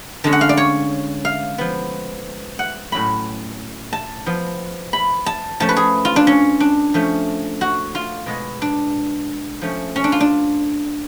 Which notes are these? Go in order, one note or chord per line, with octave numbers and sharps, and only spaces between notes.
D3 G#3 C#4 A5
F#5
F5
D5
C#5
F5
F3 B3
F#5
A2 F#3 C#4 B5
A5
F3 B3
B5
A5
F3 A3 C#4 A5
B4
G#4
F4
D4
C#4
D4
F3 A3 C#4
F#4
F4
B2 G#3 B3
D4
F3 A3 C#4
C#4
D4
F4
D4